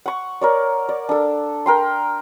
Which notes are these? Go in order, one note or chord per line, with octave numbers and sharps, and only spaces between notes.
F#5 C#6
A#4 C#5 D5
D5
D4 A4
A#4 G5 C6